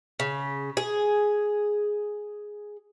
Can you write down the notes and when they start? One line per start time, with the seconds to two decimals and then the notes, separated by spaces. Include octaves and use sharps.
0.20 C#3
0.77 G#4